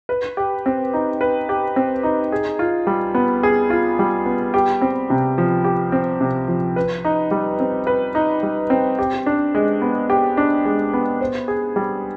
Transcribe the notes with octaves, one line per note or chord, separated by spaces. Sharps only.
B4
G4
C4
D#4
B4
G4
C4
D#4
G#4
F4
G3
B3
G#4
F4
G3
B3
G4
C4
C3
F3
G4
C4
C3
F3
B4
D#4
G3
C4
B4
D#4
G3
C4
G4
D4
G#3
B3
G4
D4
G#3
B3
C5
G#4
G3